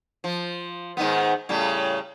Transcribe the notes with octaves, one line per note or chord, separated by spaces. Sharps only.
F3
G#2 D#3 B3
A2 C#3 G3